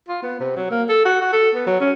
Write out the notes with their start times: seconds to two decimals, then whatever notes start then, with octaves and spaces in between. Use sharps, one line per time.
0.08 F4
0.23 B3
0.40 C3
0.56 F#3
0.71 A#3
0.89 A4
1.05 F#4
1.21 F#4
1.33 A4
1.55 B3
1.67 F#3
1.80 C#4